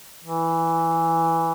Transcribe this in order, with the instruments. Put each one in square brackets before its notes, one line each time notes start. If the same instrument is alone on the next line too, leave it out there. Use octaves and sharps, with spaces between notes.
[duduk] E3